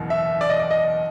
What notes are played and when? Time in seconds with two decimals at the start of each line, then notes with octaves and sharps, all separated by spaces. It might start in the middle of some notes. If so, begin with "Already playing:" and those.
Already playing: F#1 E2 B2
0.10 E5
0.41 D5
0.50 D#5
0.60 D5
0.71 D#5